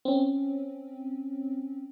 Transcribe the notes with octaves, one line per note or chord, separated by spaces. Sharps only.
C4 C#4